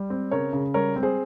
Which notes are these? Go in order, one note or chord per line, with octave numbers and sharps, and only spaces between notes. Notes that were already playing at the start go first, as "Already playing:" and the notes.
Already playing: G3
C4
C#3 A#4 C#5
C#3
G3 A#4 C#5
C4
G#4 C5